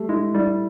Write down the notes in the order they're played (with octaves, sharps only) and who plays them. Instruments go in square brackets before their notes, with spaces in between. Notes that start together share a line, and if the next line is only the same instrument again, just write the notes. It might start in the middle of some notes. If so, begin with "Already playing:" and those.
Already playing: [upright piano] G3 A3
[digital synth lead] G#3 [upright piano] E4
[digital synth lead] G3 [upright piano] E4